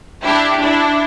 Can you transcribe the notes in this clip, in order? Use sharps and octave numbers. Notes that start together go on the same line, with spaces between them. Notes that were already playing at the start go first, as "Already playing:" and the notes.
D4 E4 G4
D4 E4